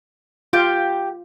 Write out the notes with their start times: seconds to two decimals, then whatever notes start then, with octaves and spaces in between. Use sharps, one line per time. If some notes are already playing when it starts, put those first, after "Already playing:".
0.53 F4 G4 F5 G5 A5